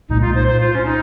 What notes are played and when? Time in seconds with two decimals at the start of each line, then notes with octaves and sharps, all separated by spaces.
0.09 C2 A#2 G#3 D#4
0.22 F4
0.35 C5
0.47 C5
0.60 F4
0.75 C#4
0.85 D#4